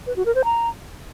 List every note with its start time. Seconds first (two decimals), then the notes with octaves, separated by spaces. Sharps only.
0.07 B4
0.16 F#4
0.26 A#4
0.35 C5
0.44 A#5